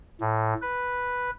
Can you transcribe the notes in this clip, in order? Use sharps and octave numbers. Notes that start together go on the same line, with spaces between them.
A2
B4